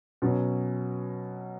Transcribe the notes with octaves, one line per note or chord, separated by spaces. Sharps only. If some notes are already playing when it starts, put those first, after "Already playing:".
B2 F#3 C#4